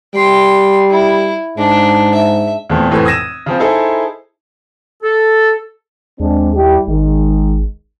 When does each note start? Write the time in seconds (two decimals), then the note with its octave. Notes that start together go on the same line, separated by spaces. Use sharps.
0.14 G3 G5 C6
0.90 E4
1.58 G#2 D4
2.14 E5
2.69 E2 A#2 A3 C4 G5
2.91 F1 A2 E3 C4 A4 E6
3.06 D#6 E6 G#6 A#6 D#7 E7
3.46 C#3 F3 C4
3.59 D#4 E4 G#4 A4 C5
5.03 A4
6.20 D#2 G#3 C4 D4
6.56 G3 E4 G4
6.87 G#1 D#3 G#3